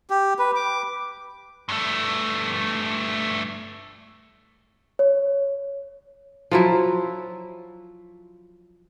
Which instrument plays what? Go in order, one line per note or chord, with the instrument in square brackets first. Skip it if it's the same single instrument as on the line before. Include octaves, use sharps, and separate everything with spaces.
[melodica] G4
B4
D6
[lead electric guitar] G2 A3
[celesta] C#5
[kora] F3 F#3 E4